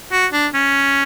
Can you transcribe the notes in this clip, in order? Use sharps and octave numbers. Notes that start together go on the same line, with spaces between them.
F#4
D4
C#4